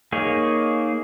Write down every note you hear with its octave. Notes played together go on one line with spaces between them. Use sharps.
A#3 D#4 G#4 C#5